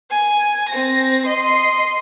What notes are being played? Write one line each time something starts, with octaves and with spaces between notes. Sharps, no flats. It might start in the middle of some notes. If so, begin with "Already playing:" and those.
G#5
C4 A#6
D#5 C6